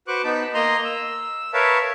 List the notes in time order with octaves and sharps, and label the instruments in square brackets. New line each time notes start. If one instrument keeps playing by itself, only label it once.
[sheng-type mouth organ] F#4 B4 C5 C#6 D6 F#6
B3 D#4 A5 B5
A#3 D#5 A#5 C6
E6
A#4 B4 C#5 E5 F5 A5